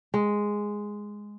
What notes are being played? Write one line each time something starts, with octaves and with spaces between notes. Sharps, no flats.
G#3